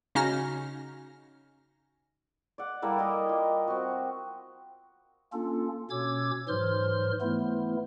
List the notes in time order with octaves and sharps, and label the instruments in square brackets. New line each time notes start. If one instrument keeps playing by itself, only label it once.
[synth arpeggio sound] C#3 C#4 D#4 F#4 F6 A#6
[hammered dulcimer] D5 F#5
G3 A#3 E4 A4
E4 A#4 D#5
F4
C4 F#4
[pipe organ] A#3 C#4 D4 F4 A4
B2 C#4 C#5 D6 E6 G#6
G#2 E3 F#3 C5 C6 F6
E3 A3 B3 E4